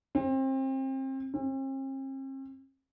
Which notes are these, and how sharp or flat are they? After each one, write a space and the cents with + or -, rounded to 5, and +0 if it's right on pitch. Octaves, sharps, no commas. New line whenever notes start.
C4 +30
C4 +45